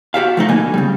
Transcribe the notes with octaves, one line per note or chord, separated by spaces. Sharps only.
F#4 G4 E5 F5
F3 A3 D#4
B2 D3 A#3 G#5
C#3 G3